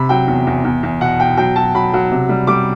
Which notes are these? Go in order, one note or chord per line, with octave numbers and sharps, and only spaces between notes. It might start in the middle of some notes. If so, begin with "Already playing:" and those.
Already playing: C3 B5
F#3 G5
E2
E2
E2
E2
B2 F#5
B2 G5
F#3 G5
F#3 A5
F#3 B5
F#3
C3
G3
G3 D6